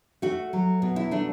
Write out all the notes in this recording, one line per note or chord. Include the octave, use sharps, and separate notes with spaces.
A3 F#4
F#3
B2
E4
A3 D4